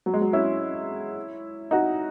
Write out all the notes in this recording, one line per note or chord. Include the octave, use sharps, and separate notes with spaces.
F#3
G#3
F#3
C#4 E4
D#4 F#4